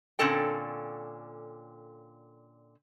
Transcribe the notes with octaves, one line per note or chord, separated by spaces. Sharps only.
A#2 D3 C4 C#4 A4 G5